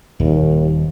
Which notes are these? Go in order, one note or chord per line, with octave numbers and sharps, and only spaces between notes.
D#1 D#2